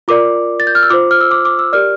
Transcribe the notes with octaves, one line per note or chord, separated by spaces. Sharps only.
F4 A#4 D5 D6
A6
G6
F6
E6
F4 C5 D6
F6
E6
D6
D6
E6
G4 A#4 D5 F6